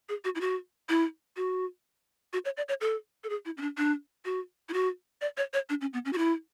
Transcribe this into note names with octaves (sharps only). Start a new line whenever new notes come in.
G#4
F#4
E4
F#4
E4
F#4
F#4
C#5
D5
C#5
A4
A4
G#4
E4
C#4
D4
D4
F#4
E4
F#4
D5
C#5
C#5
D4
C#4
B3
C#4
F#4
E4